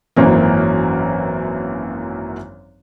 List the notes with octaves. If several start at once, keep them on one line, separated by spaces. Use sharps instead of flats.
G#1 F#2 E3 A#3